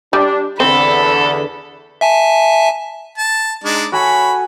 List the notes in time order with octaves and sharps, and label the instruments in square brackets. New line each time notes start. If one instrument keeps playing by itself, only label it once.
[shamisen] G3 [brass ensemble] D4
[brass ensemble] E2 D3 [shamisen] C4 [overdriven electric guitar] A4 [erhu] B5
[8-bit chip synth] E5 G#5 A5
[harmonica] A5
G#3 D4 D#4
[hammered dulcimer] F#4 A4 G#5 [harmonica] C#5 B5